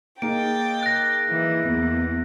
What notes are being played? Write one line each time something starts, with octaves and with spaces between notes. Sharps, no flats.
A#3 D#4 G#4 G5 A6 D7
F#6 A#6
E3
E2